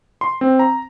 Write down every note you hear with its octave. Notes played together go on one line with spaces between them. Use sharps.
C6
C4
A#5